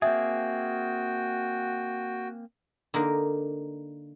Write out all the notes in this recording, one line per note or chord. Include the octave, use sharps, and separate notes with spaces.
A#3 C4 F#4 G#4 E5 G5
D3 A#3 D#4 A#4